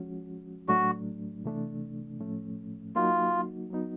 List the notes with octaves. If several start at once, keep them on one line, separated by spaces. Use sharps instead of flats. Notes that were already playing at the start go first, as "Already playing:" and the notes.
Already playing: F3 G#3 C#4 F#4
A2 F#3 A3 D4 F#4
C3 E3 A3 D4
A2 F3 A3 C#4
F#3 A#3 D#4 F4 F#4
F#3 B3 D#4 F#4